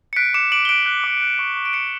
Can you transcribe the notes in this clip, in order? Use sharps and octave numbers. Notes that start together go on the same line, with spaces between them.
C#7
F#6 B6 D7
D6 C#7 E7
D6 D7 F#7
G7
F#6 D7 F#7
F#6
D6
F#6
C#6
C#6
D7
F#6 C#7 E7